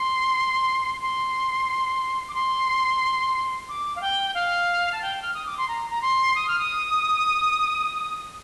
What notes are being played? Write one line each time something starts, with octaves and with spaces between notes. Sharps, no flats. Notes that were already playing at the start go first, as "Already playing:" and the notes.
Already playing: C6
C6
D6
C6
D6
F5
G5
F5
A5
G5
F6
D#6
D6
C6
A#5
A#5
C6
D#6
F6
D#6